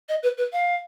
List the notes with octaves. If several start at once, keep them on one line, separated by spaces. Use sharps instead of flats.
D#5
B4
B4
F5